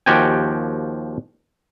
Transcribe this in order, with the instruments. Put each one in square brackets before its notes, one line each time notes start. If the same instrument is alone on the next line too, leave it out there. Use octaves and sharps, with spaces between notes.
[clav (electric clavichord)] D#2 F3 F#4 G4 G5 G#5